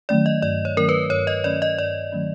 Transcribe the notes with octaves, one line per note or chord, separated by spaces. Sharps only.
D#3 F#3 A3 C#4 D5
D#5
G2 D5
C#5
D#3 F#3 A3 C#4 A#4
B4
G2 C#5
D#5
D#3 F#3 A3 C#4 D5
D#5
G2 D5
D#3 F#3 A3 C#4